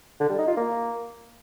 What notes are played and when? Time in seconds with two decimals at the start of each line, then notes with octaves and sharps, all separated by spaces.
0.20 D3
0.29 G3
0.38 D#4
0.48 F4
0.57 A#3